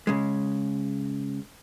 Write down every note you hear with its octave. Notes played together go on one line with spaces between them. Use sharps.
C#3 G#3